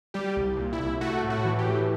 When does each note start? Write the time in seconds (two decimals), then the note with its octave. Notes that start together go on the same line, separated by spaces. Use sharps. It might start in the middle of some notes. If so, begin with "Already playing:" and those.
0.14 G3 G4
0.37 C2
0.57 A#2
0.73 E4
0.80 C2
1.01 A3 F#4
1.23 A2
1.30 F#4
1.45 E3
1.59 G4
1.67 A2